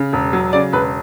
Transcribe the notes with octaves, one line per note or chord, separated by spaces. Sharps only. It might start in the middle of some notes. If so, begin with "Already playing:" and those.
Already playing: C#3
E1
F#3
C#3 D5
E1 B4